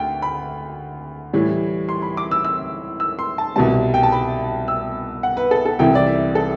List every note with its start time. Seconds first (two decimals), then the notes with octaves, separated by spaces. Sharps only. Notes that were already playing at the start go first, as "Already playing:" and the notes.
Already playing: D2 G5
0.22 B5
1.33 A2 E3 G3
1.89 C6
2.02 B5
2.17 D6
2.31 E6
2.45 E6
3.00 E6
3.19 C6
3.38 A5
3.56 C2 B2 G3 A5
3.94 G5
4.03 A5
4.12 B5
4.68 E6
5.23 F#5
5.37 B4
5.51 A4
5.65 A4
5.79 C2 C3 E3 G5
5.95 D5
6.06 E5
6.35 A4